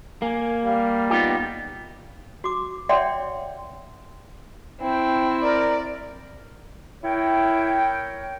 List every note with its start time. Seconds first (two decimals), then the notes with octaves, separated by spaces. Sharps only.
0.22 A#3 G#5
0.65 G3 F5
1.10 B3 D#4 F4 G4
2.44 F#4 D6
2.89 C#5 D5 E5 F#5 G5 C6
4.81 C4 E4 G5
5.43 A#4 D5
7.04 E4 A#4 C#5 G5